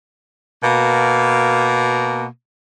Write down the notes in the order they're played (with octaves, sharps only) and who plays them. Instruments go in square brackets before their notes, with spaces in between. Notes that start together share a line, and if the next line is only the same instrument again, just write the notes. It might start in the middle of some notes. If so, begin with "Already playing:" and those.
[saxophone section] B2 A#3